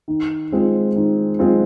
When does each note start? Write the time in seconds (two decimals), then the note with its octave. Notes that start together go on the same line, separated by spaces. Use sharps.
0.08 D#3
0.52 G#3 C4 F4
0.96 D#3
1.39 G#3 C4 F4